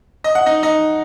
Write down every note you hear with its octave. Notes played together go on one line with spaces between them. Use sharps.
D#5
F#5
D#4 D#5
D#4 D#5